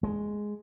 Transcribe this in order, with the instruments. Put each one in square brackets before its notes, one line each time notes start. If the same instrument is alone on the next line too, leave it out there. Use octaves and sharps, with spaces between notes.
[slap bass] G#3